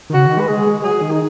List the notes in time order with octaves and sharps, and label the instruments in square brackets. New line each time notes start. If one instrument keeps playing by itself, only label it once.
[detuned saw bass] D#3
[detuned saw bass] C#3 [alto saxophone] F#4
[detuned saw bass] D#3
[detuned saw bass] G#3 [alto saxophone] B4
[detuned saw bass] G#3 [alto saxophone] G#4
[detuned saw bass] G#3
[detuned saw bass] F#3 [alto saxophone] G#4
[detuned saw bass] D#3
[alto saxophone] D#4